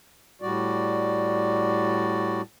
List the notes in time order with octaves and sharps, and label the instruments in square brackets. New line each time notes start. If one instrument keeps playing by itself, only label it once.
[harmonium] A2 G3 F#4 D5